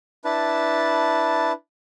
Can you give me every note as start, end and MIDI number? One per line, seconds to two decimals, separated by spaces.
0.25 1.52 62
0.25 1.52 64
0.25 1.52 71
0.25 1.52 81